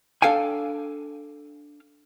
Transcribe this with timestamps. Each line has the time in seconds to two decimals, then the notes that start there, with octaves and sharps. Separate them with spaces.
0.22 D4 A4 F5 G5 G#5